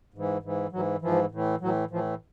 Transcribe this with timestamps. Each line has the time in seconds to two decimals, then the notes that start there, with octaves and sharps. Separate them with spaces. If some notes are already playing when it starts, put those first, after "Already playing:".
0.14 G#2 E3
0.43 G#2 E3
0.72 G#2 E3 F#3
1.02 G#2 E3 F3
1.32 A2 E3
1.60 A2 E3 F#3
1.91 A2 E3 F3